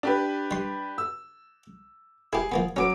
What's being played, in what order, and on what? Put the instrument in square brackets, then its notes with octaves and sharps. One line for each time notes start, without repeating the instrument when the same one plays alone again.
[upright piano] D4 G4 B4
[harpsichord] G3 C6
[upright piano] E6
[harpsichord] E4 G4 [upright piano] G#4
[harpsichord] F3 A#3 B3
[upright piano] F#3 D6 D7 [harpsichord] B3 C#4